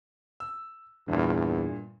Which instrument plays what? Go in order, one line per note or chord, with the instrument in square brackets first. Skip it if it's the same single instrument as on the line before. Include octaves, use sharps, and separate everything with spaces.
[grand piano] E6
[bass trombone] E2 [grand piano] G2 A#2